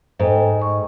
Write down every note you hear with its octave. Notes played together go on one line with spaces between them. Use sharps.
G#2 A4 D#5 G5
D#5 C#6